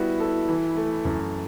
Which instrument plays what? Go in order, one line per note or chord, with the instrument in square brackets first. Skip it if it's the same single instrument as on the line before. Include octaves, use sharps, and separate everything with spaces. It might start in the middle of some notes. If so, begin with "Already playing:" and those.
Already playing: [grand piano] G3 B3 F#4 [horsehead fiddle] E4
[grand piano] A4
E3
A3
F#2